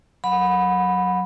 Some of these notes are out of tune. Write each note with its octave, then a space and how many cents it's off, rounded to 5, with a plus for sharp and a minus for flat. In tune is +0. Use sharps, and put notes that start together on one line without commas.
F#3 +0 F#5 -25 B5 +0